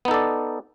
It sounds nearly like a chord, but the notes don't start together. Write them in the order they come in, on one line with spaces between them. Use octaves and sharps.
B3 D#4 A4 D5